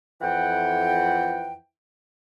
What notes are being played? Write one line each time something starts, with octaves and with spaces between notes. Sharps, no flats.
F2 E3 F#5 G5